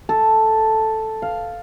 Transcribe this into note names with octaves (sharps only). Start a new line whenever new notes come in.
A4
F5